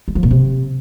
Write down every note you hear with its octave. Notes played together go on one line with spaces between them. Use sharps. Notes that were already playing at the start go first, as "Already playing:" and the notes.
G#3
F3
A#2
C3